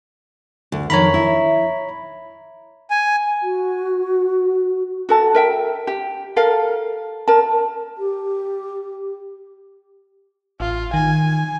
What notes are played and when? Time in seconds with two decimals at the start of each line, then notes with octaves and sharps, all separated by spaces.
0.72 D2
0.90 F2 D#3 C#5 A#5 B5
1.14 E4
2.90 G#5
3.43 F#4
5.09 F#4 A4 A5
5.35 A#4 E5 G5
5.87 G4
6.36 A4 A#4 F5
7.28 A#4 A5
7.98 G4
10.60 A1 F4
10.94 D#3 G#5